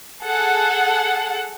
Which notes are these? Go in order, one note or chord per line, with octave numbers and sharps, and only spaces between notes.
G#4 A4 F#5